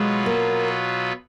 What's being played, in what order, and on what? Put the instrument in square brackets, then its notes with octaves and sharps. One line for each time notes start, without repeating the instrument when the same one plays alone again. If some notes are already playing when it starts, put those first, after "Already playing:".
Already playing: [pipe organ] B2 F#3 B3 F4 B4 [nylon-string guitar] G#3
[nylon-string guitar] A#3